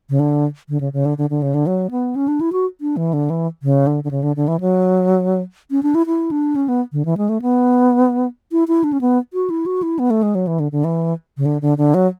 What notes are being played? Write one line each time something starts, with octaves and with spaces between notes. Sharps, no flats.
C#3
D3
D3
C#3
C#3
D3
D3
D3
C#3
D3
F#3
B3
C#4
D4
E4
F#4
D4
E3
D3
E3
C#3
D3
D3
C#3
D3
D3
E3
F#3
C#4
D4
E4
E4
D4
C#4
B3
D3
E3
G#3
A3
B3
E4
E4
D4
C#4
B3
F#4
E4
F#4
E4
B3
A3
G#3
F#3
E3
D3
D3
E3
C#3
D3
D3
D3
F#3